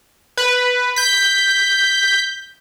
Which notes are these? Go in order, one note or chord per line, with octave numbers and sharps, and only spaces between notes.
B4
G6 B6